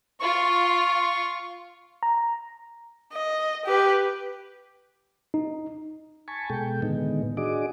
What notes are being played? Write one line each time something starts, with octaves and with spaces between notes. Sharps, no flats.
F4 C#6
A#5
D#5
G4 B4
D#4
G#5 A5 B5 C#6
B2 G#3 A4 G5
A2 D3 D#3 G#3 B3 D#4
D4 F#4 G#4 D#5 D6